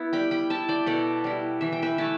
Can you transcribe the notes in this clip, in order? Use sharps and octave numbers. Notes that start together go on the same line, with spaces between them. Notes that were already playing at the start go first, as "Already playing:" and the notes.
Already playing: B3 E4
G3 G5 B5
G5 B5
E4 E5 A5
D5 G5
B2 A4 D5
G3 E4
E3 E5
G5
B4 E5
A3 E4 E5 A5